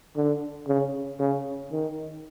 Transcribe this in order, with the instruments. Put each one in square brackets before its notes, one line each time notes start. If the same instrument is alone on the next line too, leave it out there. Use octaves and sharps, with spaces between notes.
[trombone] D3
C#3
C#3
D#3